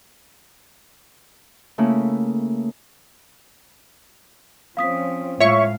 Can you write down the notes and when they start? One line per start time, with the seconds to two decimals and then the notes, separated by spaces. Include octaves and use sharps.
1.78 C#3 A3 A#3 C#4 E4
4.77 F3 C4 C#4 F5 D#6 B6
5.40 A2 G#3 F4 C#5 E5 F5 C#6